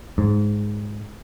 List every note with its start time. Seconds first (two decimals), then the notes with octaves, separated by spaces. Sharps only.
0.18 G#2